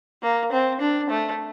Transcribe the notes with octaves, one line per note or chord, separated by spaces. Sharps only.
A#3
C4
D4
A3